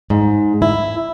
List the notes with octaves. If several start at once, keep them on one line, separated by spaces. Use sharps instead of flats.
G#2
E4